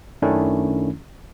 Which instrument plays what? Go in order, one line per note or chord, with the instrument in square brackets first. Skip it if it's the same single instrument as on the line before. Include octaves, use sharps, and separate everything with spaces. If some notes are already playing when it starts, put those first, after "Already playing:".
[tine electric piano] F#2 D#3 A3 C#4 D4 E4